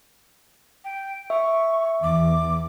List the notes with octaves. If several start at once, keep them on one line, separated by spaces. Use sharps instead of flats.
G5
E5 C#6
E2 D6